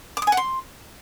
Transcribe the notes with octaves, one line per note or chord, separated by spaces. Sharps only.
D6
D#6
G#5
F#5
C6